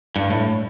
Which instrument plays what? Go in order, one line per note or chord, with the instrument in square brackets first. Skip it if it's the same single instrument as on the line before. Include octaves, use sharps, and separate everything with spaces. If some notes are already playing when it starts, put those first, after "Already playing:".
[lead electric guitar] G2
A2